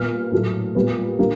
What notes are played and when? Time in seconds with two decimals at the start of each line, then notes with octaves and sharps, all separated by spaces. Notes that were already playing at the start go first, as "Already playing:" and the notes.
Already playing: A#2 G3 B3 F6
0.32 A2 F#3 A3
0.75 A#2 G3 B3
1.19 D3 G3 A#3